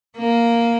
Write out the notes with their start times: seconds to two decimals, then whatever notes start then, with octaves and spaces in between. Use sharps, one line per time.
0.18 A#3